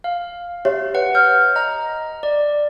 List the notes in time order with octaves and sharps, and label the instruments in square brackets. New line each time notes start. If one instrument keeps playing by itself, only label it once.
[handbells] F5
[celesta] G4 C#5 E5
[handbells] B4 F#5
[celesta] F6 [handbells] G6
[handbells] D#5 A#5
D5